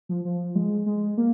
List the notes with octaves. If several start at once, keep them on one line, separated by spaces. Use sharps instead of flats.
F3
F3
G#3
G#3
A#3